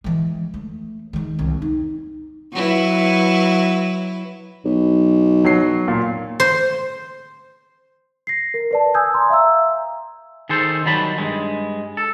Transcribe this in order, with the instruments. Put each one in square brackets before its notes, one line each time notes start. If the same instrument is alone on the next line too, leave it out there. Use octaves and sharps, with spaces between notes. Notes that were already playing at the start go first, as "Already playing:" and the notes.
[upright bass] E3 G#3
A3
D#3 G#3
C2
D#4
[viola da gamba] F#3 E4 B4
[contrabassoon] B1
[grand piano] F#3 C7
A#2
[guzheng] C5
[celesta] A#6 C7
A#4
B4 D5 A5
G#5 D#6 E6 G6 G#6
A#5 C6
E5 F5 A#5 E6
[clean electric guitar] D#3 G#4 A4 C5
D#3 F#3 G3 A5 B5
G2 G#3
A4